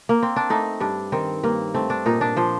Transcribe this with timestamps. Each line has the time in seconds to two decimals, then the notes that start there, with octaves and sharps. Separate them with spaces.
0.09 A#3
0.23 C4
0.36 D4
0.50 A3 D#4
0.80 G2 D4
1.12 D#3 C4
1.43 G2 A#3
1.74 A3 C4
1.90 D4
2.06 A#2 D#4
2.21 D4
2.36 F3 C5